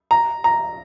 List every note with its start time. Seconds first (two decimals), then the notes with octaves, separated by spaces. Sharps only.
0.11 A#5
0.44 A#5